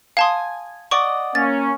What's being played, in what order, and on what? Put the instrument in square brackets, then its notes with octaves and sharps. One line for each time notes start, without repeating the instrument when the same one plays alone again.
[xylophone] F5 A5 C6 [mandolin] G#5 D#6
[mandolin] D5 D#5 F#5 [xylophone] C#6
[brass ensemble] A#3 C#4 [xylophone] A6